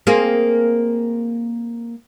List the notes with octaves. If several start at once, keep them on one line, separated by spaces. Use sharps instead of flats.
A#3 C4 G#4